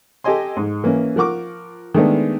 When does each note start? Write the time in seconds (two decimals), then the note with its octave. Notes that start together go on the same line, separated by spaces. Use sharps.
0.24 G4 A4 D#5 G#5 C6
0.57 G#2
0.84 E3 A#3 C#4
1.16 F3 A#4 F#5 C#6 D6
1.94 D#3 G#3 A3 B3 D4